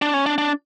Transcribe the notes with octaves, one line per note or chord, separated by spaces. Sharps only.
D4
C#4
D4
D4